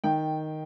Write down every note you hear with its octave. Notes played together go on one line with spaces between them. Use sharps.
D#3 G5